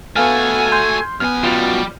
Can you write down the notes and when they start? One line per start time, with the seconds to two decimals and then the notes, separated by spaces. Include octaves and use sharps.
0.16 A3 B3 F#4 A4 F5 G#5 F6
0.72 C6 G6
1.20 F#2 B3 G#5 F6
1.43 F#2 B2 G3 F4